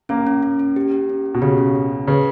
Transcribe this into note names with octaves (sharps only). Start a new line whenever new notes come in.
A#3 C#4
C#4
C#4
C#4
G4
G4
C#4
C#4
B2
C#3 G4
C#4
C#4
C#4
C#3 B4